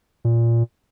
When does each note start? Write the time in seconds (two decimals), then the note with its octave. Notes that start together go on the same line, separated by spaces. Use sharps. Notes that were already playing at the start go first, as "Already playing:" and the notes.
0.25 A#2